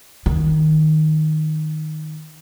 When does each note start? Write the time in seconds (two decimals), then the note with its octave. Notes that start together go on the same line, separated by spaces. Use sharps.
0.26 D#3